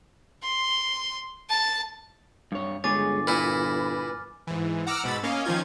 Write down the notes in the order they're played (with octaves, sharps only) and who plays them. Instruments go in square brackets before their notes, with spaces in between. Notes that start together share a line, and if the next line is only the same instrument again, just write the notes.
[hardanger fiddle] C6
A5
[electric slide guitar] G2 C#5
[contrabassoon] G1 [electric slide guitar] G#3 G#4 C#5 [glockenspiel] G#5 D6 A6
[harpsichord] A#2 E4 [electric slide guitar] B4 [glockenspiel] F6
[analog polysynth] G#2 E3
F#5 A#5 D6 E6 F6
G#2 B2 B5 E6 A6
A#3 C#4 C#5 D#5 F5
D#3 F3 C#4 D#4 F4 G#6